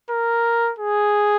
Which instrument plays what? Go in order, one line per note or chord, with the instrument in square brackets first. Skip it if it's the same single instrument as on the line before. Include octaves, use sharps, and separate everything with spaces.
[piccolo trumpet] A#4
G#4